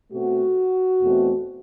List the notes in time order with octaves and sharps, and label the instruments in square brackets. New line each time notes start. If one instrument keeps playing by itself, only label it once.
[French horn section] B2 A3 C4 F#4
E2 B2 A3 C4